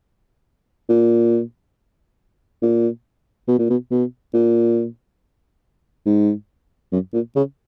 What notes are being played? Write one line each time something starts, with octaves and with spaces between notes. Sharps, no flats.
A#2
A#2
B2
A#2
B2
B2
A#2
G#2
F#2
A#2
C#3